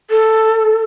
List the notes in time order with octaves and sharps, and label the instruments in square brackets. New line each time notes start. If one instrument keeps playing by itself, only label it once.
[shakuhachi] A4